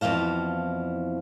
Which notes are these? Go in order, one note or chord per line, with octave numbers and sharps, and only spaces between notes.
F2 B2 E3 F5 A5